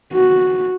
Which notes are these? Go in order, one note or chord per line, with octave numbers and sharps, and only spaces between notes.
F#4